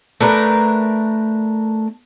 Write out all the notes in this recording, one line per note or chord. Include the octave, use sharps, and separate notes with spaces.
A3 D4 A#4 B4